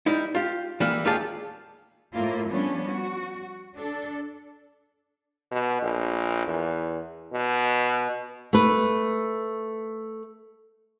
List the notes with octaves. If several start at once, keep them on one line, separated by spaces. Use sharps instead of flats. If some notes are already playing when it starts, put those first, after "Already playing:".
G3 D#4 E4
F4 G4
E3 G3 A#3
D#2 F4 G4 G#4 A5
A2 A#3 E4 F4
F3 G3 B3 C#4 D4
F#4
D4 A4
B2
A#1
E2
B2
A3 B4